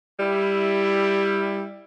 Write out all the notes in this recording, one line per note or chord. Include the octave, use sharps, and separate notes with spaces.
G3 E4